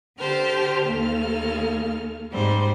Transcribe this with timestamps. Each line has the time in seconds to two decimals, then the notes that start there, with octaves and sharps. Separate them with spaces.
0.18 D3 G4 C5 A5 F6
0.85 D#2 A#3 A4 F6
2.31 G#2 G3 C5